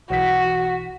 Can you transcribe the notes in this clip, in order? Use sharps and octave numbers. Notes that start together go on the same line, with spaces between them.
B1 E3 F#4 B6